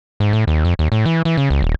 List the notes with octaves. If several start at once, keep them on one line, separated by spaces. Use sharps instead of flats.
G#2
A2
D#2
F2
D#2
A2
E3
E3
C#3
C#2
D#1